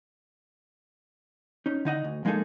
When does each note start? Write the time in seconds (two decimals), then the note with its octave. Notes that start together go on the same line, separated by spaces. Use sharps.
1.66 C#4 D#4
1.85 D3 D#4 D#5 F#5
2.04 D2
2.25 F3 G#3 A#3 D#4 G#4 A4